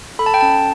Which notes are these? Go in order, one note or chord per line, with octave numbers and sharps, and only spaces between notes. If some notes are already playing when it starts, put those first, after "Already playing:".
A4 B5
A5
G5
C#4 A5